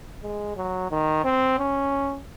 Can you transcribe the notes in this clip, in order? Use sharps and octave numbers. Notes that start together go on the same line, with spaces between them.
G#3
F#3
D#3
C4
C#4